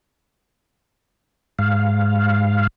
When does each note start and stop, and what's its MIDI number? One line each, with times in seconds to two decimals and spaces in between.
1.59 2.67 44
1.59 2.67 77